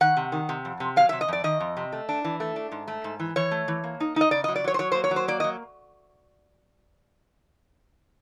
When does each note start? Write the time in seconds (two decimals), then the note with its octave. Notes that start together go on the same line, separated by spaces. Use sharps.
0.01 D#3 F#5
0.17 C3
0.32 D#3
0.49 C3
0.65 F2
0.80 C3
0.96 F#3 F5
1.09 E5
1.13 C3
1.21 D#5
1.28 F2 D5
1.44 D#3 D#5
1.60 F2
1.77 C3
1.92 A3
2.09 D4
2.24 E3
2.40 A3
2.56 D4
2.72 G#2
2.88 A3
3.04 G#2
3.20 E3
3.36 E3 C#5
3.51 A3
3.68 E3
3.84 A#3
4.00 D#4
4.16 D#4 D#5
4.31 C#3 D5
4.44 D#5
4.48 F#3
4.56 D5
4.64 F#3 C#5
4.74 C5
4.79 F#3 C#5
4.92 C5
4.95 A#3
5.04 C#5
5.11 F#3
5.16 C5
5.28 A#3 D5
5.40 D#5
5.44 F#3